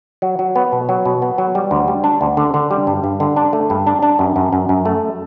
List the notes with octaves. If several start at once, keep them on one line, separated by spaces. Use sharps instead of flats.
F#3
F#3
B3
B2
F#3
B2
B3
F#3
G3
D2
G3
D4
D2
D3
D3
G3
G2
G2
D3
D4
A3
G2
D4
D4
F#2
F#2
F#2
F#2
A3